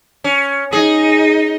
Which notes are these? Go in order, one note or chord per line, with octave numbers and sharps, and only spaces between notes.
C#4
D#4 G#4